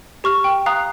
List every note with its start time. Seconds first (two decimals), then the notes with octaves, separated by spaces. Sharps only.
0.24 G4 C#6 F6
0.44 G5
0.66 F5 A#5 D#6 F#6